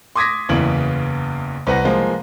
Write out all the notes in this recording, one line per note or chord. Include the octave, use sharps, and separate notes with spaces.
C6 D6 D#6 G#6 A#6 B6
F#1 E2 C#3 E3 B3 F#7
C2 C4 B4 F#5 A#6
F3 G#3 A#3